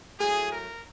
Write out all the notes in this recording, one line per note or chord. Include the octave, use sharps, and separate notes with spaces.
A2 F#3 A3 G#4
A#4